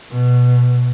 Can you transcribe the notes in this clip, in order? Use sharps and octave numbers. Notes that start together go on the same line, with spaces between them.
B2